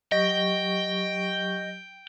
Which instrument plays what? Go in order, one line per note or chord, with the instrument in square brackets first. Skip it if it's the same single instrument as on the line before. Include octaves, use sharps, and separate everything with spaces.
[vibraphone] F#3 G4 C#6 [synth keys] D#5 A#6 [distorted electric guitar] G5